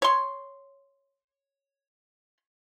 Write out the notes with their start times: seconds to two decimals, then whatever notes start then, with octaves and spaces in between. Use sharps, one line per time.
0.02 C#5 C6